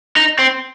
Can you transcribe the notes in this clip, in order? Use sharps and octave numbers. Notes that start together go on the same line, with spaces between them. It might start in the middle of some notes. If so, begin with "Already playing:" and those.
D#4
C4